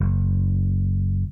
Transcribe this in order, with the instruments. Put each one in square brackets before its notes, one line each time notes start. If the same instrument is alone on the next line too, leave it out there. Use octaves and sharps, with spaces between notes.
[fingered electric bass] F#1